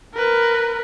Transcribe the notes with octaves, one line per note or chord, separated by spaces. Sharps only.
A#4 B4